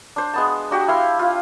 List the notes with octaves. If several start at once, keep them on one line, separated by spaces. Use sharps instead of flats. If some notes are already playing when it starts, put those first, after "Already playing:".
D4 C5
G#3 B3 A5
D4 F#4 G4
E4 F5 C6
F4